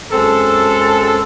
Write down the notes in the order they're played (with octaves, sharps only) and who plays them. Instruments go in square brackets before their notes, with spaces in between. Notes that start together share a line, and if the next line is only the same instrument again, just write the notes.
[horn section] F#2 G#3 C4 A4